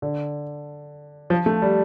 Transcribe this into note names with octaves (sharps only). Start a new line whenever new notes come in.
D3
F3
A3
G3